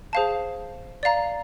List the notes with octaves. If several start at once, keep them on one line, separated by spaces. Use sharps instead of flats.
G#4 C5 F5 A5
D5 F5 A#5